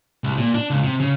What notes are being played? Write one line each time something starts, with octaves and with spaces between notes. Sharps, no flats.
C2
A#2
D4
C#2
C3
C#3